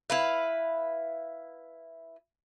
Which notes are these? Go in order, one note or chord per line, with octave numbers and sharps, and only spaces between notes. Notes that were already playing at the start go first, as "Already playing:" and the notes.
E4 B4 F5